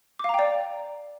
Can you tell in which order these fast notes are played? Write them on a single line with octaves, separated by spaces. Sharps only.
D6 F5 A#5 G5 D5